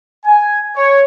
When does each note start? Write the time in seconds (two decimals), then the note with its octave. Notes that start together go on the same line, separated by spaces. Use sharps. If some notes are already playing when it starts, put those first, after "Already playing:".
0.25 G#5
0.76 C#5